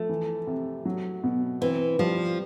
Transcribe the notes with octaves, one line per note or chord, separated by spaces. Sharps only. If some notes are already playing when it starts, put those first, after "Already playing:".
Already playing: F3 A3
E3
C3
F#3
B2
E3 C4
F3 G3